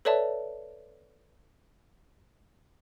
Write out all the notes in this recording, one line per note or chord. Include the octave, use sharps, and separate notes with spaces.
A4 B4 C#5 D5 E5 A5